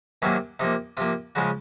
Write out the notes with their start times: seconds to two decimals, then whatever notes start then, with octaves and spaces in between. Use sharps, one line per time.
0.22 C3 D#3 F#3 A#3 C#4
0.60 C3 F3 A#3 D#4
0.97 C3 F3 A#3 F4
1.35 C#3 F3 G#3 F#4